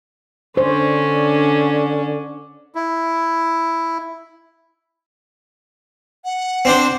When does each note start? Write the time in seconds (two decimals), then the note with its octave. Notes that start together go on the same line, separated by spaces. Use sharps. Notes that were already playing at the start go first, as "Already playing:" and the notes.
0.57 D3 C#4 D4 C5
2.75 E4
6.25 F#5
6.65 C4 D4 C5